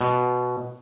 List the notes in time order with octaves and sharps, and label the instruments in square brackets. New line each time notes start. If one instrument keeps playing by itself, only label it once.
[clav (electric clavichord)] B2